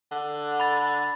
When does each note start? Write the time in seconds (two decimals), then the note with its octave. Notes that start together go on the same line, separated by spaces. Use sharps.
0.11 D3
0.60 B5 A6